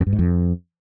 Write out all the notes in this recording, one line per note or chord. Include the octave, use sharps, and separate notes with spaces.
F2
G2
G#2
F2